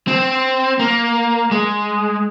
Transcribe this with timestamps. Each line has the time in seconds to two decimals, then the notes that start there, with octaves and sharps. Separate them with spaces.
0.08 C4
0.79 A#3
1.51 G#3